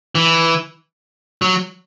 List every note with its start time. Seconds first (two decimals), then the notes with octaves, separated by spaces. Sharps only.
0.15 E3
1.42 F#3